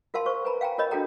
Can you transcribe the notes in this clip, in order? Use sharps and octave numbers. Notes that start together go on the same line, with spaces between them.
F4 A#4 F5 A5 C6
C5 C#6
B4 G#5 A#5 B5
F5 G5 G#5 A#5
F4 A#4 C#5 D#5 B5
D4 F4 F#4 A4 G5 A#5